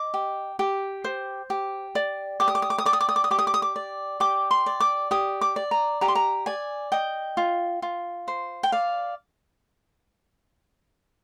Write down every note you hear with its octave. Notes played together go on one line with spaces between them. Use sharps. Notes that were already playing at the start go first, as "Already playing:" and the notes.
Already playing: D#5 D6
G4
G4
C5
G4
D5
G4 D6
D#6
D6
D#6
D6
D#6
D5 D6
D#6
D6
D#6
D6
D#6
G4 D6
D#6
D6
D#6
D6
D5
G4 D6
C6
D5
D6
G4 D#6
D6
D5
A#5
G4 A#5
C6
A#5
D5 G#5
D#5 G5
F4
F4
C5
G5
D5 F5